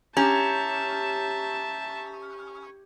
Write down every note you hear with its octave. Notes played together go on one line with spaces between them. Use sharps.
C#4 G4 E5 A5 A#5